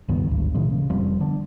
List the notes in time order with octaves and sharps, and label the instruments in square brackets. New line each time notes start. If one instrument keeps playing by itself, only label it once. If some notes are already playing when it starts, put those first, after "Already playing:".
[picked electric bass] C#2 G2 D#3 B3
G#1 D2 G2
A#2 C#3 E3 G#3
C#3
F1 F3 G3 C4
D3 B3 D4